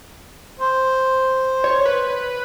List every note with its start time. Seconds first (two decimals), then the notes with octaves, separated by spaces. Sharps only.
0.59 C5
1.64 C#5
1.85 B4